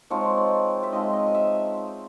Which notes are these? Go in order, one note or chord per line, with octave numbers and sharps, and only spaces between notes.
F3 G#3 C4 D#4 C#5
D5
E5
F3 G#3 C4 D#4 D#5
D#5
D#5
E5